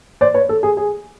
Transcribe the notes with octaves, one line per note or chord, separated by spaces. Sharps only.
C5 D5
B4 C#5
A4
G#4
G#4